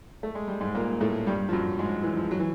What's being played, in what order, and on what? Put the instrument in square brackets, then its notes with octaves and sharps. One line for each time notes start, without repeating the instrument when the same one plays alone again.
[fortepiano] A3
G#3
G3
G#2 G#3
A#2 A#3
A2 A3
G2 G3
F3
F#2 F#3
G#2 G#3
E3
F3
F#3
E3